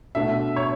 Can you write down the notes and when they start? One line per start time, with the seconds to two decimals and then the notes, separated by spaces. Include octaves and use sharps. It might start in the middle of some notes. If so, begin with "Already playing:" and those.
0.15 B2 A3 D4 E5
0.56 C#5